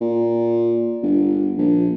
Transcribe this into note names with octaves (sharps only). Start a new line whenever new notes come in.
A#2
G1
A#1